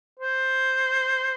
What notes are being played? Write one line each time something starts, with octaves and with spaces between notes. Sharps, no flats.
C5